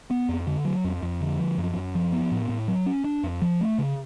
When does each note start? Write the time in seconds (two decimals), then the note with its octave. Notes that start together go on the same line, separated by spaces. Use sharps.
0.11 B3
0.29 F2
0.47 D3
0.65 F#3
0.84 F2
1.02 F2
1.21 D3
1.39 F3
1.58 F#2
1.76 F#2
1.95 F3
2.12 B3
2.32 A2
2.49 A2
2.68 F#3
2.86 C#4
3.04 D4
3.23 F2
3.42 F3
3.61 A3
3.78 C#3